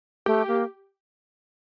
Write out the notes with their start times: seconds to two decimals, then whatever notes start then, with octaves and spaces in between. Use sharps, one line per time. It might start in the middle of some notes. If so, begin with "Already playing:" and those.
0.26 A3 G4
0.48 A#3